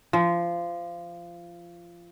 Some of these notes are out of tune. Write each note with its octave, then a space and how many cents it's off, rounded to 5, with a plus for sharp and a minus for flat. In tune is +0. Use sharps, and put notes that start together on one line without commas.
F3 -20